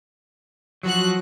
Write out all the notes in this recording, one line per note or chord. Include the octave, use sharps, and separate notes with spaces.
F3 F#3 F#4 F#6